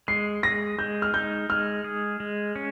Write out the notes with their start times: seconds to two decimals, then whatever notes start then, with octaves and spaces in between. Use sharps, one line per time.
0.08 G#3 C7
0.43 G#4 A#6
0.79 G#3 G6
1.02 F6
1.14 D#4 G6
1.49 G#3 F6
1.84 G#4
2.20 G#3
2.56 C#4